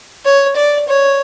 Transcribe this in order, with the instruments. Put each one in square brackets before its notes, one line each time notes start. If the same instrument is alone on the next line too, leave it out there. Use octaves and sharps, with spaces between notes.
[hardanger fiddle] C#5
D5
C#5